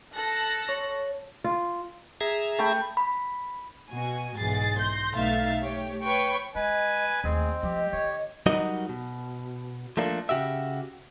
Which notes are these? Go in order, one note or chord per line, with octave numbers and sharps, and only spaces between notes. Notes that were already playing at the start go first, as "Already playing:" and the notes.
A4 F#6 A#6
C#5
F4
G#4 E5 A#5
A3 G5 B5
B5
B2 F#4 G#5
B1 G#2 E3 G#4 A6 C7
C6 G6 A#6
B1 A3 D#4 E5 F5 A6
A3 G4 C#5
B4 C#5 G5 C#6
G#3 B4 D#5 G#5
D#2 A3 C4 G#4 D#5
F3 A3 G4
D3 C#5
F#3 G3 D#4 F#4 A#4 D#5
B2
F3 A3 A#3 D4 A4
C#3 F#4 G4 E5